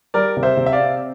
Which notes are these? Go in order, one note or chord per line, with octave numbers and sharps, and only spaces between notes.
G3 A#4 D5
C3
C5 E5
C3
E5
D5 F5
C4